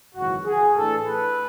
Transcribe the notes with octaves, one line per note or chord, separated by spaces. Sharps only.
G#1 F#2 C#3 E3 F#4
G#4
A2 E3 A3 D4 A4
B4